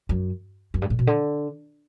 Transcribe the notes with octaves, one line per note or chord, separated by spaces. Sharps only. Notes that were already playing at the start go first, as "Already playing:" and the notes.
F#2
F#2
G2
A2
B2
D3